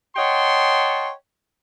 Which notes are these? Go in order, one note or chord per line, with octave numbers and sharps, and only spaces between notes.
C#5 D#5 F#5 G5 A5 C6